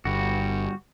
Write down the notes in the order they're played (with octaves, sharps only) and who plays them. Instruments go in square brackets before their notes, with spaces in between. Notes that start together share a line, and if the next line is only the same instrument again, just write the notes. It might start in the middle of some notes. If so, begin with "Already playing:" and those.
[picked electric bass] G1 [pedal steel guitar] G3 F#4